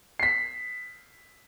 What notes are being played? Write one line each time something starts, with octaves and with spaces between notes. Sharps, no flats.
B6 C7